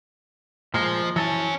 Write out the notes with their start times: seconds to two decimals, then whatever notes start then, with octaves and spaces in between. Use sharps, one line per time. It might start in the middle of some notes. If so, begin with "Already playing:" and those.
0.74 A#2 F3 G#3
1.16 E3 F#3 C#4 A5